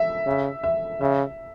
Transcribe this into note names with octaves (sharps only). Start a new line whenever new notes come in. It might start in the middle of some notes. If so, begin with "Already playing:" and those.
Already playing: E5
C#3
E5
C#3 E5